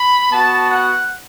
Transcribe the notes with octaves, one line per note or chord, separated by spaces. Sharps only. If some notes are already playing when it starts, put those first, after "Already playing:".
Already playing: B5
B3 F#4 A5
F#5